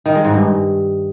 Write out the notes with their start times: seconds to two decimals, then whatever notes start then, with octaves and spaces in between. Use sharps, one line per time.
0.06 D#3
0.15 G#3
0.25 G#2
0.34 G2